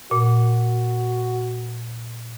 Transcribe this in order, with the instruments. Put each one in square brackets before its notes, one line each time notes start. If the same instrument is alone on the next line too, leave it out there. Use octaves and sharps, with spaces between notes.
[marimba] A#2 [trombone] F#4